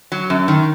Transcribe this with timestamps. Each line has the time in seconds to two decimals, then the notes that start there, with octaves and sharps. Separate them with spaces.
0.12 F#3
0.30 F#2
0.48 D#3